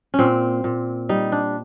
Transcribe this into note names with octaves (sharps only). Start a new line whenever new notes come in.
C#4
A#2 C4
A#2
G3 D#4
D4